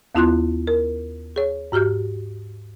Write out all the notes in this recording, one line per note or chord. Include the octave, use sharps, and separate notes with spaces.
D#2 B3 E4 F4 C6 F#6
A#4
G#4 C#5
G#2 F#4 G4 F6 G6